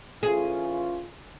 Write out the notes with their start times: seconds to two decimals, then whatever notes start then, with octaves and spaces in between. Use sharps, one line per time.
0.23 E3 C#4 F4 G#4